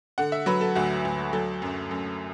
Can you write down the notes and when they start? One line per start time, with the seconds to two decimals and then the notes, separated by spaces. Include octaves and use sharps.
0.18 D3 F#5
0.32 E5
0.46 F#3 B4
0.61 A4
0.75 D2 F#4
1.05 D2
1.33 F#3 A4
1.62 F#2
1.91 F#2